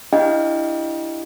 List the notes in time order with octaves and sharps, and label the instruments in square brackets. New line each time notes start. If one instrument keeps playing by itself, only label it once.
[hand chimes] D4 E4 G4 D#5 F5 G5